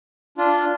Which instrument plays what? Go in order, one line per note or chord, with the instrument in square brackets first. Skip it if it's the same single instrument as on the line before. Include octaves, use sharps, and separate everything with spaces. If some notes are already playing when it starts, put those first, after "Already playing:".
[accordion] D4 F4